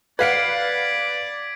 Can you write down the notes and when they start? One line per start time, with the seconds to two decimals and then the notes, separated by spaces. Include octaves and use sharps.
0.19 B4 D5 F5 F#5 G#6 B6 D7